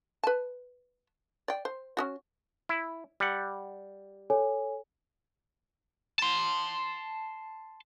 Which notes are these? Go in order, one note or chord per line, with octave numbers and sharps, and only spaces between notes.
B4 A5
D5 G5
C5
C#4 D#4 F#4
E4
G3 F#5
A4 C#5 G#5
A5 C6